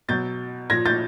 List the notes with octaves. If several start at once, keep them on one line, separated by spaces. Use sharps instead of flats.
B2 F#3 G6 A6
A#2 F3 G#6 A#6
G6 A6